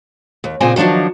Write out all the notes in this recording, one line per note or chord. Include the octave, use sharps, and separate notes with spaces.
D#2
A#2 C#3 C4 D#5 G#5
D#3 F3 F#3 D4 D#4